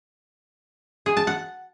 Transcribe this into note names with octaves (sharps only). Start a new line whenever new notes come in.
G#4
A5
F#5